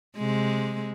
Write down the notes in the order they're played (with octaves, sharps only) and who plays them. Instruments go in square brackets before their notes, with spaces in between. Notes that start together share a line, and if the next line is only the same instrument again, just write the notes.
[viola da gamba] C3 G#3